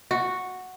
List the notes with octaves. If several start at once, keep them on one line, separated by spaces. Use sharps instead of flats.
F#4